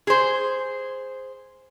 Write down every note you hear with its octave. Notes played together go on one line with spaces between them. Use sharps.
G#4 C5